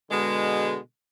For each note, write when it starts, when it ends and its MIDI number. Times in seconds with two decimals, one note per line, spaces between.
0.10 0.77 47
0.10 0.77 50
0.10 0.77 56